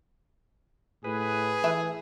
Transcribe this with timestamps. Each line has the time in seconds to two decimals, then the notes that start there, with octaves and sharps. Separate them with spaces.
1.04 A2 G#4 B4
1.64 E3 A3 E4 E5